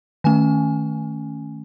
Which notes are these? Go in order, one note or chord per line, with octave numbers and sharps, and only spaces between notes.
D#3 A3 C#4 G#5